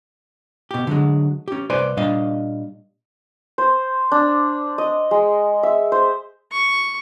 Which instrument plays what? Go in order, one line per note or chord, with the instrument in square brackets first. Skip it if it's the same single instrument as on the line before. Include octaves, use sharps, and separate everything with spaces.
[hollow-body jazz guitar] B2 G4
D3 F#3 G#3
C#4 G4
C2 B4 C5 D5 G#5 C6
A#2 G3 D4 D#5 F5
[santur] C5
D4
D#5
G#3
E5
C5
[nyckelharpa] C#6